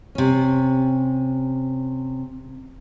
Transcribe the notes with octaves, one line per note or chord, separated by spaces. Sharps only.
C3 C#4